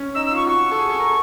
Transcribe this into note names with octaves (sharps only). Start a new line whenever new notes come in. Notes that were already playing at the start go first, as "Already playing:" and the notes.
Already playing: C#4
D#4 E6
E6
F4 C#6
F#4 C#6
A4
G#4
A4
A#4